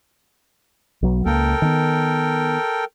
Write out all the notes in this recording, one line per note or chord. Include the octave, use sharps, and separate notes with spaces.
B1 F#3 B3
C#2 A#3 A4 A#4 G5
D#3 B3